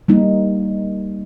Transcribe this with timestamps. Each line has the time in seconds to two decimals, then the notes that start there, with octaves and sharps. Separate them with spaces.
0.08 G3 A#3 D#4